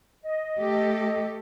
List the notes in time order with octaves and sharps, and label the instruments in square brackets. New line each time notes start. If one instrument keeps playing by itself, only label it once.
[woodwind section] D#5
[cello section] A3 G4 A4